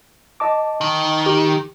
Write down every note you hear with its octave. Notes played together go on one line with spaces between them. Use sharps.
D#5 A5 D6
D#3
G4